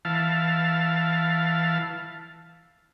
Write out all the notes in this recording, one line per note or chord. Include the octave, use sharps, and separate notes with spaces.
E3 F5 A5